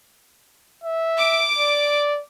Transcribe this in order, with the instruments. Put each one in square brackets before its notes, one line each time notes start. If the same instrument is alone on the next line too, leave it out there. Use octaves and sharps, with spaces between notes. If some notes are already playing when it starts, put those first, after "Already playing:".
[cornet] E5
[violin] D6 D7
[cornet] D5